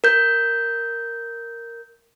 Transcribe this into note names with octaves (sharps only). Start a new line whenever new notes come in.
A#4 G6